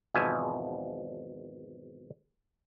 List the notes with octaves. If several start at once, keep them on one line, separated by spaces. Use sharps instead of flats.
G#1 E2 B2 F3 E5 G#5